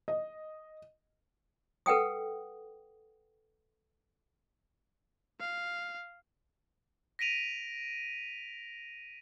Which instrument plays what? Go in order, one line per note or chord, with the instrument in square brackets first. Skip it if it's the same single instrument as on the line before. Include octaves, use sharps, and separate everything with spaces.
[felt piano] D#5
[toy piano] A4 B4 F#5 G5 D#6
[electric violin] F5
[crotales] A#6 B6 D7 D#7 F7